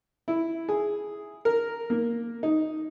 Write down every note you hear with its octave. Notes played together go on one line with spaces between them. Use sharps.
E4
G#4
A#4
A#3
D#4